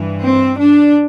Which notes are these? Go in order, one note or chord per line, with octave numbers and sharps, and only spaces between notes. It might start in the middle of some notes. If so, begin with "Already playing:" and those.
Already playing: G2 E3
C4
D4